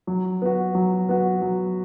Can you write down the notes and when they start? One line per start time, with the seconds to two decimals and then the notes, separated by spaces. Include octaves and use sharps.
0.07 F#3
0.42 B3 F#4
0.75 F#3
1.09 B3 F#4
1.42 F#3